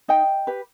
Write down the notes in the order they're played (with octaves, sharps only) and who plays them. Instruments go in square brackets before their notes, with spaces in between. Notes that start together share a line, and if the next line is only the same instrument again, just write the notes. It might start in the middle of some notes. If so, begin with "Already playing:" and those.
[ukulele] D#4 D#5 G5
G4 B4